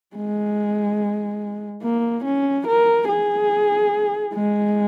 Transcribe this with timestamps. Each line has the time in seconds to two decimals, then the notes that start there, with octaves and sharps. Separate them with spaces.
0.17 G#3
1.83 A#3
2.25 C#4
2.67 A#4
3.09 G#4
4.34 G#3